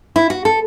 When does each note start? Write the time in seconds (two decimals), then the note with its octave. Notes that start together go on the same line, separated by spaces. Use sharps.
0.16 E4
0.30 F#4
0.45 A4